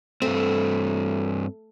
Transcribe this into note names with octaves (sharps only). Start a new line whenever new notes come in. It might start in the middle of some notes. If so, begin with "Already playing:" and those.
G2 A3 C4